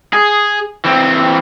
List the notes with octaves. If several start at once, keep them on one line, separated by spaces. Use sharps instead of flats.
G#4
E3 C4